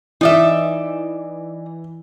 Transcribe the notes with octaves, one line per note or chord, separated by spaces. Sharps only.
E3 D#4 D5 E5